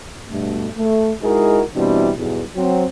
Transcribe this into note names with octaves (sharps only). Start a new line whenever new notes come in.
G2 B2 A3
A3
G#3 D#4 E4 F#4 G#4 A#4
B2 E3 G3 C4 D4 E4
B1 E2 G2
F#3 C4